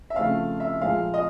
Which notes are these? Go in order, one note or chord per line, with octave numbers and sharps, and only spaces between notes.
E5
C#3 F3 A3 C4 F5
E5
A#2 F3 G#3 F5
D#5